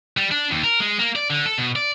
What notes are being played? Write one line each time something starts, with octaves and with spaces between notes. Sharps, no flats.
G3
D4
D#2
A#4
G#3
A#3
D5
D3
A4
B2
D5